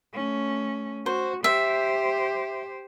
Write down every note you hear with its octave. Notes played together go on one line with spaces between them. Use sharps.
A3 C#4
F#4 C5
G4 C5 E5